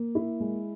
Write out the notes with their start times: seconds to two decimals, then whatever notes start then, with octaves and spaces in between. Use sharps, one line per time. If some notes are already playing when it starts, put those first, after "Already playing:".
Already playing: A#3
0.15 E4
0.40 G#3